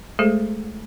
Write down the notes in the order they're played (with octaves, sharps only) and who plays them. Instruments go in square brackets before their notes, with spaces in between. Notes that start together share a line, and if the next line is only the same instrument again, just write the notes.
[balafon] G#3 A3 G#4 A4 C5